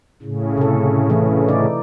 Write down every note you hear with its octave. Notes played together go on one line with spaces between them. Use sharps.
A2 C#3
C3 A4
E3 A3 E4
D#4 D5